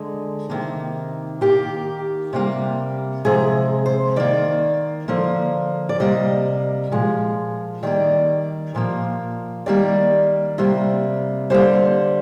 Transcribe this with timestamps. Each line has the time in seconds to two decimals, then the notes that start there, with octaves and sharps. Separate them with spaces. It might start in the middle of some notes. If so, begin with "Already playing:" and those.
Already playing: D3 G#3
0.50 C3 D#3 A#3
1.41 D#3 A#3 G4
2.33 C3 G3 A#3
3.25 C3 F3 G#3 G#4
3.86 C5
4.16 D#3 A#3 D5
5.08 D3 F3 A#3
5.89 D5
6.00 C3 G3 A#3 D#5
6.92 A#2 F3 G#3
7.83 D#3 G3 A#3 D5
8.75 A#2 F3 A#3
9.66 D#3 G3 A#3 D5
10.58 C3 G3 A#3
11.50 D3 G3 A#3 C5